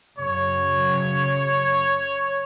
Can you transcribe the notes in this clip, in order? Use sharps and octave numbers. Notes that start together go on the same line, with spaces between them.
F#2 C#3 C#5